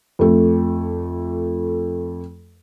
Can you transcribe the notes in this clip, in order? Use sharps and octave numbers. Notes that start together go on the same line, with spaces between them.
F2 A3